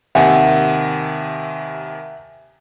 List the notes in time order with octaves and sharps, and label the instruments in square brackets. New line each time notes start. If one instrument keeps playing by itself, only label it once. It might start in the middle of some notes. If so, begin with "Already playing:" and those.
[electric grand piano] D#2 C3 D#3 [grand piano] E5 F#5 G#5